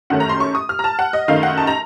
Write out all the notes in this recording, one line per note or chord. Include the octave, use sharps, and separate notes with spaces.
F#2 D#3 A3 C#4 F#5
A#5
C6
C#6
D#6
F6
A#5
A5
F#5
D#5
F#2 D#3 A3 D#4 F5
F#5
A5
A#5